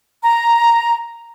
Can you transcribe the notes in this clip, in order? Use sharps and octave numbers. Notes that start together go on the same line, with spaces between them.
A#5